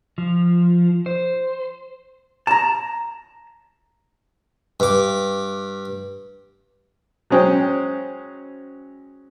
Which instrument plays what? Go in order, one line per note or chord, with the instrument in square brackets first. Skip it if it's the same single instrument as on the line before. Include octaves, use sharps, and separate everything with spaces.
[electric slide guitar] F3
C5
[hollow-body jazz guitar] A5 A#5
[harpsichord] G2 D6
[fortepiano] F#3 G#3 C#4 C5 G5